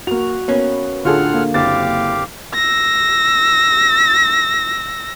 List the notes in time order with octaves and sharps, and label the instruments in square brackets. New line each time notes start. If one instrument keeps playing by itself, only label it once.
[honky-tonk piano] A#3 F7 [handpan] F#4
[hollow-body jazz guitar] A#3 C#4 [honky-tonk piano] B3
[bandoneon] A2 F#5 F6 [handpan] D3 [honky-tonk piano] F4 G#4 A4
[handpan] A#3
[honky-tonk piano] F#1 A6 [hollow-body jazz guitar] C4 [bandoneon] G4 F5 D6
[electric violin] E6 A#6